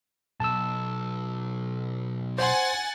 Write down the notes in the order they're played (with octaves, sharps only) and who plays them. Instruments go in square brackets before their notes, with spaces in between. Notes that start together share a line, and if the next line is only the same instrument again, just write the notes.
[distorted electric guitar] B1 [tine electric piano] A5 E6
[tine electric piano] C5 C6 [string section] F#5 G#5 A6